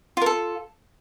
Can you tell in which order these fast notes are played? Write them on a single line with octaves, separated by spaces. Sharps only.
F4 A#4 A4